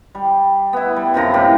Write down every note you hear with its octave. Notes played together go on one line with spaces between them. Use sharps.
G3
B3 E4
G3
F#2 C3 F3 A#5
A2 C3 G4